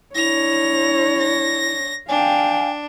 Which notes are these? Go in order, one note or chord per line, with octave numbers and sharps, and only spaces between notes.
D4 E4 C#5 A#6 F7
A#6
D4 F5 G5 G#5